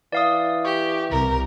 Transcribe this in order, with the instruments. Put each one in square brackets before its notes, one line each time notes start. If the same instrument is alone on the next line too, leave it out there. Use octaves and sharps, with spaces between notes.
[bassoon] E3 [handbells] D5 F5 D#6
[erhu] G4 [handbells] C#6
[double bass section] C2 [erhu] A#4